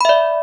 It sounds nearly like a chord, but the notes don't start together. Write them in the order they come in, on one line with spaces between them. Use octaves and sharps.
B5 E5 D5